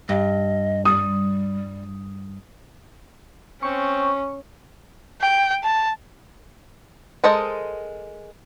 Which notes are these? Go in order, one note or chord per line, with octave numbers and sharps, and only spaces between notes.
G2 D#5
G3 D#6
C4 C#4 C#6
G5
A5
G#3 A4 A#4 C5 D#5